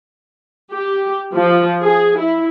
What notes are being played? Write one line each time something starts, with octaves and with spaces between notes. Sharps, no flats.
G4
F3
G#4
E4